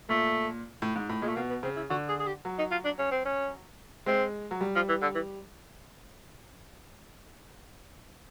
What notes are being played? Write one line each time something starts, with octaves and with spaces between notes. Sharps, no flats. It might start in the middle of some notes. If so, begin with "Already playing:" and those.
A#2 A3
A2
G#2
A2
A#2 G#3
A3
B2 A#3
B3
C#3 C4
E4
D3 F#4
G#4
G#4
G4
F#3
D#4
F4
D4
C#4
C4
C#4
G#3 C4
F#3
G3
F3
E3
D3
E3